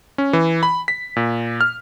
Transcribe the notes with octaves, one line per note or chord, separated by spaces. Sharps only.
C#4
E3
B5
B6
A#2
F6